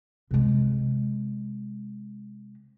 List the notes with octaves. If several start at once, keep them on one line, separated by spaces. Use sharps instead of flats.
C3 G#3